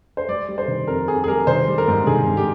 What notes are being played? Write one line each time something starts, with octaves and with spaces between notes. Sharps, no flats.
C5
G3 D5
G3
C5
D#3
F2 A#4
F2 G#4
G#4
G3 A#4
D#3 C5
G3
A#4
G#2
D#3 G#4
G#2
G4